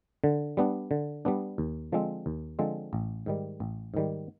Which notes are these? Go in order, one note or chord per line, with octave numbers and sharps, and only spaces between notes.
D3
G3 B3 D4
D3
G3 B3 D4
D#2
D3 F3 G#3 C4
D#2
D3 F3 G#3 C4
A1
G#2 D#3 G3
A1
G#2 D#3 G3